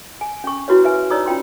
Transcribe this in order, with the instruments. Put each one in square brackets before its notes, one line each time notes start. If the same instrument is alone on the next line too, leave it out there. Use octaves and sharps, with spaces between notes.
[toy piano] G#5
C#4 C#6
E4 F#4 B4 C#5
A#4 B4 E5 G#5
D#4 C#5 D5 A#5 D#6 E6
C#4 F4 G5 C6